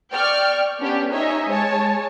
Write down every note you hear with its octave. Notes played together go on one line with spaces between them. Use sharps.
D5 G5 C#6 F6
B3 C#4 D4 G4
D#4 C#5 D#5 E5 G#5
G#3 C#5 G#5 A5